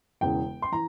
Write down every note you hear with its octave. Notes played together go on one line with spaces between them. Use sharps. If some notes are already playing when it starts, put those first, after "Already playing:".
E1 E2 C#3 E3 G5
C6
E3 A#5